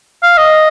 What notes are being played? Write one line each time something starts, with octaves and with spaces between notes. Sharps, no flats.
F5
D#5